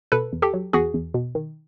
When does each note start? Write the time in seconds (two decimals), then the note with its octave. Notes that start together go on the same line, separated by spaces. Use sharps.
0.12 B2 A4 B4
0.33 E2
0.42 G4 A4
0.54 F#3
0.73 E2 F#4 G#4
0.94 E2
1.14 B2
1.35 D#3